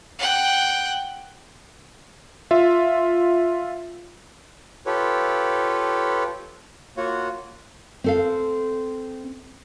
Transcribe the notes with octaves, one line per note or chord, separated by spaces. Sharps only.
F#5 G5
F4 E5
F4 G4 A4 B4 C#5
A#3 F4 F#4 C#5 F#5
C4 A4 F5